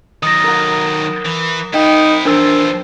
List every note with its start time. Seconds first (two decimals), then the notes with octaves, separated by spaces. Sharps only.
0.23 D#3 F#3 D#6 A6 A#6
0.44 A#4 F#5
1.25 E3
1.74 C2 D#4 E4 G5
2.25 E2 F3 D4 A#4 C5 E6